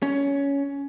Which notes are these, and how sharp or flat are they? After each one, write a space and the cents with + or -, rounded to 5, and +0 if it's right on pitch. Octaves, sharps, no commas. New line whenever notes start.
C#4 +15